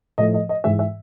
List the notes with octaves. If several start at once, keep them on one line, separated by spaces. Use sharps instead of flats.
A2 F3 A3 D#5
D#5
D#5
G#2 E3 G#3 E5
E5